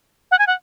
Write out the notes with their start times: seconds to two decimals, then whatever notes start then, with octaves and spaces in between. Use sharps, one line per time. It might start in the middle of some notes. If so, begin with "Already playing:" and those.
0.31 F#5
0.39 G#5
0.47 F#5